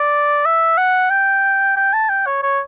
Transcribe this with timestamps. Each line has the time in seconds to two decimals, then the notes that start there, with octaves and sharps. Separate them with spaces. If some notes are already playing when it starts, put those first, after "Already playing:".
Already playing: D5
0.46 E5
0.78 F#5
1.10 G5
1.77 G5
1.93 A5
2.09 G5
2.26 C#5
2.43 C#5